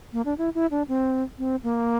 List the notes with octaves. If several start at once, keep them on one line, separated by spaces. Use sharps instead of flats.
A#3
D4
E4
E4
D4
C4
C4
A#3